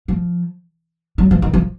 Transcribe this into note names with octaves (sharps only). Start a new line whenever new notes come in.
F3
F#3
F3
D#3
F3